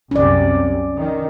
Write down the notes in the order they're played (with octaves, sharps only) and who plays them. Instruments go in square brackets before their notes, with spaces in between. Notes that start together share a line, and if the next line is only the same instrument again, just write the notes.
[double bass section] C2 F#2 C3 [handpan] C#4 D5
[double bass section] D#3